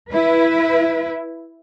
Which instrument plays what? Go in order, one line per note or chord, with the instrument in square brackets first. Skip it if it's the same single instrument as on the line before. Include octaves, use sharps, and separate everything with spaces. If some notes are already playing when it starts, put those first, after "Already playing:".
[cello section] E4 B4